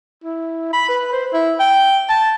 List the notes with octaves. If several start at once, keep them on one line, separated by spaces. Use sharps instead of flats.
E4
B5
B4
C5
E4
G5
A5